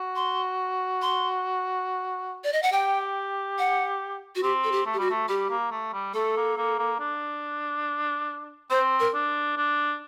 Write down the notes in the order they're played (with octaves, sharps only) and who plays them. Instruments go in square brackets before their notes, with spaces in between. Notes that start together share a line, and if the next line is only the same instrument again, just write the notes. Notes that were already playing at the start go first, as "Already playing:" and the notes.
Already playing: [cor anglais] F#4
[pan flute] C6
C6
D5
D#5
F#5
[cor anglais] G4 [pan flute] G5
[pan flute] F#5
F#4
[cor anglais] C4 [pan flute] G4
[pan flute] A4
G4
[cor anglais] A3
[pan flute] G4
[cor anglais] G3 [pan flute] F#4
[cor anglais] A3
[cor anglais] G3 [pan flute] G4
[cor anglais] A#3
A3
G3
[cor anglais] A3 [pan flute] A4
[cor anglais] A#3
A#3
A#3
D4
[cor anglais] C4 [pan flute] C5
[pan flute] A#4
[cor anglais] D4
D4